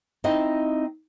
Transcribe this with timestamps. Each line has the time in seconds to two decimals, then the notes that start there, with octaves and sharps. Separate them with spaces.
0.24 C4 D#4 E4 D#5